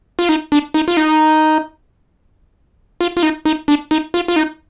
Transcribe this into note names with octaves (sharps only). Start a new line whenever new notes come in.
F4
D#4
D4
D#4
F4
D#4
F4
F4
D#4
D#4
D4
D#4
F4
F4
D#4